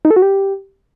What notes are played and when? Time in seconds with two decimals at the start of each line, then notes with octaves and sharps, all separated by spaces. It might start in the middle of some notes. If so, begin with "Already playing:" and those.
0.05 D#4
0.11 A4
0.16 F#4
0.22 G4